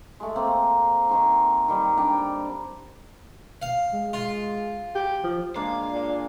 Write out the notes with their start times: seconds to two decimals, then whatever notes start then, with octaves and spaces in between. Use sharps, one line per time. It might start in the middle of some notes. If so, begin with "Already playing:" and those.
0.20 G#3 A3
0.36 A#3 C4
1.09 D#3 C5 G#5
1.68 D#3 G3 C4
1.97 D4 G5 A#5
3.62 F5
3.93 G#3
4.13 F4
4.95 G4
5.24 F3
5.56 G#3 A#3 D4 F5
5.91 A#2